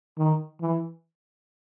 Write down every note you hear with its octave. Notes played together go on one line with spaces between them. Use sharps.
D#3
E3